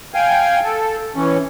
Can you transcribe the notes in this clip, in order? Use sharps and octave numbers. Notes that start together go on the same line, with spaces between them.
F5 G5 G#5
A4
E3 C#4